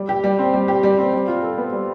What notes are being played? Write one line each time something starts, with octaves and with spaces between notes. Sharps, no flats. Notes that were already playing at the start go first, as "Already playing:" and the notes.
Already playing: G3
G4
G3
C4
G3
G4
G3
C4
G3
F4
A4
B3
G3